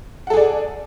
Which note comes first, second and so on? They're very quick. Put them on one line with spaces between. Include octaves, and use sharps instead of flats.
F#5 A4 G#4 D5